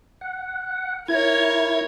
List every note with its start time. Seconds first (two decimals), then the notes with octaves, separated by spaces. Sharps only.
0.21 F#5
1.08 E4 A#4 C#5 G#6